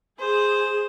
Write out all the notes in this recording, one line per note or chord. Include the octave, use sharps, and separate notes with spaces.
G#4 C5